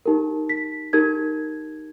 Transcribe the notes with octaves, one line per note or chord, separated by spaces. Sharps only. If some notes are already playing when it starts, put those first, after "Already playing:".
D#4 G4 A#4
B6
D#4 G4 A#4 G#6